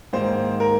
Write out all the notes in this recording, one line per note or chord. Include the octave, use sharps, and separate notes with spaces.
G#2 D#3 A#3 C5
A#4